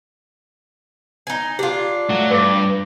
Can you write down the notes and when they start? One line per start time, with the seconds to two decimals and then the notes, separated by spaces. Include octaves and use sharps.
1.27 D#4 G#5
1.59 D4 F4 G4
2.10 F#3 A3
2.31 G2 B4 D6 A#6